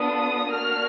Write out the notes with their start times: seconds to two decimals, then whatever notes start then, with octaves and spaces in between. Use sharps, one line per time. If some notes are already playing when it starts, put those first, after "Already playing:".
Already playing: B3 D4 F4 A4 D#6
0.52 A#3 D4 F#4 F6